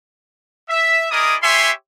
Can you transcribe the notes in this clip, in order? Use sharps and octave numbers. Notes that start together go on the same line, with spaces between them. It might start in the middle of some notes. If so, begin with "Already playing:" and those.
E5
E4 G#4 A#4 D5 D#5 D#6
G4 C#5 E5 G#5 C6